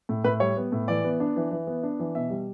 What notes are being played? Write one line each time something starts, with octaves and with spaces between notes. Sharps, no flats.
A2
A2 B4
G3 C#5
B3
A2
E3 D5
B3
D4
E3
E3
B3
D4
E3
B2 E5
G3